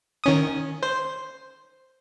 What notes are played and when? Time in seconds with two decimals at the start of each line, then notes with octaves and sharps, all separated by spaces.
0.24 D#3 C#4 D#6
0.83 C5